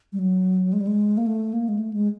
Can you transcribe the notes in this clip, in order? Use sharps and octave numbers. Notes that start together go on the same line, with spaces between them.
G3
F#3
G#3
G3
G#3
A#3
A3
A#3
G#3
A3
G#3